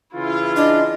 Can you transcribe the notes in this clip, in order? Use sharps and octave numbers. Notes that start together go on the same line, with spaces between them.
C#3 E3 E4 F4
D4 D#5